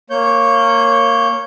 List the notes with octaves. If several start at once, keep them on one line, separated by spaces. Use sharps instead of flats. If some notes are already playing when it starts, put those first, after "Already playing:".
A#3 C#5 G6